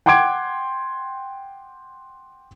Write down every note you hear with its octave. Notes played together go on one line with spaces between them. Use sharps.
F#5 G5 C6 D6 G#6 D7